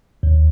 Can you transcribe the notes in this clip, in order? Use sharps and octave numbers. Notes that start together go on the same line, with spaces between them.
D#2